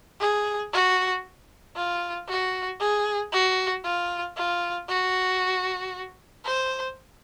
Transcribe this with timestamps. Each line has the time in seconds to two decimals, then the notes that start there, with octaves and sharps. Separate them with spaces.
0.20 G#4
0.73 F#4
1.76 F4
2.29 F#4
2.80 G#4
3.33 F#4
3.84 F4
4.37 F4
4.89 F#4
6.45 C5